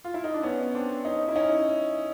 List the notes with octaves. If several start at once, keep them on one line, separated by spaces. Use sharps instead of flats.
F4
E4
D#4
D4
B3 C#4
C4 D4
C#4 D#4
E4
C#4 D#4